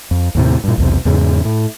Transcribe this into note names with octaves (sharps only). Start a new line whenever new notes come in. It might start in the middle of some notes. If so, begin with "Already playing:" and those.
F2
D#2 A2 C3
G2 A#2
B1 E2 C3
E2 G#2 C#3
A2